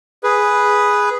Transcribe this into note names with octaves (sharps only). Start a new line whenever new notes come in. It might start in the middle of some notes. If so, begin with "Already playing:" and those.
G#4 B4